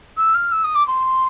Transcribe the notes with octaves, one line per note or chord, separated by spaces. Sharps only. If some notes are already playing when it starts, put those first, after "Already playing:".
E6
F6
E6
D#6
D6
C6